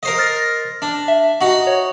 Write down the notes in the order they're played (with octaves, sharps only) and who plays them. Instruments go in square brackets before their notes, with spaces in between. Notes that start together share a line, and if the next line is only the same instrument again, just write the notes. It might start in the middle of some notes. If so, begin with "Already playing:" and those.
[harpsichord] A#4 C5 D#5
[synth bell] F6 A6 A#6
[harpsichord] D4
[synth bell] E5
[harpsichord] D#4 F#4
[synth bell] C#5